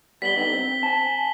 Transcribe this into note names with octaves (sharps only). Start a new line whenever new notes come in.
G3 B3 B6 F#7 G7
D3 D#4
C4
G#5 A5